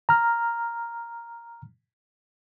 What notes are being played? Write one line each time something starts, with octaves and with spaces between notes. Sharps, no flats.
A#5 F6